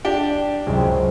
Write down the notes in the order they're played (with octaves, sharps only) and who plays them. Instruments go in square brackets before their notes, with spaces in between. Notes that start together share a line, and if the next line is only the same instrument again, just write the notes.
[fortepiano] D4 G4 G5
[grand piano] C#2 F#2 G#3 [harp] C3 F#3